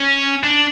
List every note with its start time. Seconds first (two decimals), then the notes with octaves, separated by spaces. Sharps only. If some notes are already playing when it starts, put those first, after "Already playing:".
Already playing: C#4
0.43 D4